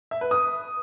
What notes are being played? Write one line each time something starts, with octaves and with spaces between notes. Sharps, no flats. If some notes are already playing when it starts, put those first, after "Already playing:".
E5
B4
D#6